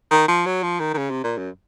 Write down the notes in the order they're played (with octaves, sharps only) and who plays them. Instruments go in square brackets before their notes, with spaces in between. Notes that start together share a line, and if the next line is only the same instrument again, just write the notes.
[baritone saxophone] D#3
F3
F#3
F3
D#3
D#3
C#3
C3
A#2
F#2